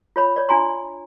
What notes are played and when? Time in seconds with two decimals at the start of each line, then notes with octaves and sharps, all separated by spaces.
0.16 F4 C#5 B5
0.36 C#5 D5
0.49 D4 F4 G#5 A#5 C6